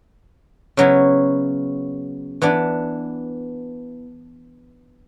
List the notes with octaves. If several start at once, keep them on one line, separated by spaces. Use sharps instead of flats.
C#3 F#3 B3 E4
E3 B3 D4